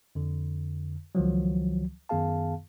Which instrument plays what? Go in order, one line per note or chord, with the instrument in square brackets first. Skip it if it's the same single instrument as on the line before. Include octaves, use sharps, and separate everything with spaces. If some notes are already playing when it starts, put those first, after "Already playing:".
[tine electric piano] F2 D3
C#2 D#3 F3 F#3
F#2 D#3 B3 G#4 F5 A5